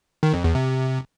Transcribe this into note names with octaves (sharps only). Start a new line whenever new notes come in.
D#3
F2
E2
C3